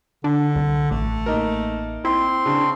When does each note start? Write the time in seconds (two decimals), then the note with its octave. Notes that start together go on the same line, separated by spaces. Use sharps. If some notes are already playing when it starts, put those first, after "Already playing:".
0.24 D3 D4
0.56 C2
0.91 A1 A3
1.26 A#3 D#4 A#4
2.05 C4 E4 C6
2.46 C#3 D4